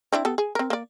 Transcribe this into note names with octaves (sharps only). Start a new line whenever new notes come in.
C4 D4 E4
B3 G4 A4
G#4
C4 A#4
A#3 D5